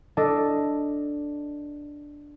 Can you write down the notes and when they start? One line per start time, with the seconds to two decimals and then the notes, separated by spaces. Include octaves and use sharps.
0.17 D4 A4 D#5